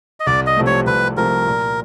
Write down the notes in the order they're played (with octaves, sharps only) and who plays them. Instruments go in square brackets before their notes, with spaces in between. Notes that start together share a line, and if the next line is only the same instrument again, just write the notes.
[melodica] D#5
[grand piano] C2 [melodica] D5
[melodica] D#5
[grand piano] C3 F3 A3
[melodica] C#5
[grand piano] C2 [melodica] B4
[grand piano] C3 F3 A3 [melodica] A#4
[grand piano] A#2